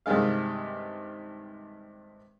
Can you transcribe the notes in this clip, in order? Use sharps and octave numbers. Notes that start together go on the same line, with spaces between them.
G2 C3 D#3 G#3 F5